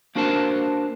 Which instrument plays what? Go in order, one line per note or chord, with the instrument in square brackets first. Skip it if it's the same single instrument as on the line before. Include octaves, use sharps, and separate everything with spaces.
[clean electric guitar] A#3 D4 F#4 A#4 C5 A5